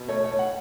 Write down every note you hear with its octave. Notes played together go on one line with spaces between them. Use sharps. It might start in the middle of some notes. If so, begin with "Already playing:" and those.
Already playing: B2
A3 C#5
C#5
A3
F#5